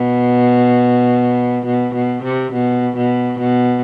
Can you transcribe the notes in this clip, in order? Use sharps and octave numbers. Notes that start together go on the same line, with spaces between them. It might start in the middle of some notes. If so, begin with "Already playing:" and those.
Already playing: B2
B2
B2
C3
B2
B2
B2